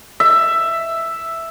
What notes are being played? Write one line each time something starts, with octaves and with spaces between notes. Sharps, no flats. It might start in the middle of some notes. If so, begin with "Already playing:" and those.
E5